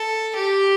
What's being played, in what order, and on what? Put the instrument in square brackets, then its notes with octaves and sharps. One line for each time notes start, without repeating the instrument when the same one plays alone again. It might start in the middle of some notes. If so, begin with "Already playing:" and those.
Already playing: [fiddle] A4
G4